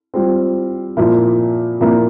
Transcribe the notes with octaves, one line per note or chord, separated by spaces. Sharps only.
G3 C4 F4
A#2 F3 A#3 E4
A#2 F3 A#3 E4